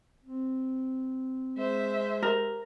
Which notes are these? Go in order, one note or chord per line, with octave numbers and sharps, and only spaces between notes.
C4
G#3 C5 E5
G4 A#4